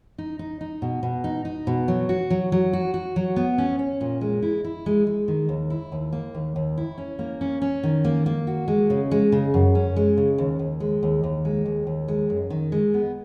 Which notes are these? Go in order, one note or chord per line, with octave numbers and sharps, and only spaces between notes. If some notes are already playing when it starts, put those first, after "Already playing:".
D#4
D#4
D#4
B2
B2
D#4
D#4
B2
F#3
F#4
F#3
F#3
F#4
F#4
F#3
B3
C#4
C#4
A#2
G#3
E4
E4
G#3
G#3
D#3
D#2
E4
D#2
A#3
D#2
D#2
E4
C#4
A#3
C#4
C#4
D#3
A#3
A#3
F#4
G#3
C#3
G#3
C#3
F#2
C#4
G#3
C#3
D#2
D#2
G#3
D#2
D#2
G#3
D#2
D#2
G#3
F#2
D#3
G#3
B3